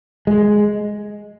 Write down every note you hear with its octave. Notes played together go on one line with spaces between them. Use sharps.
G#3